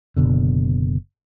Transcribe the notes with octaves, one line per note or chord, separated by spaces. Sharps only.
F#1 B1 B2 D3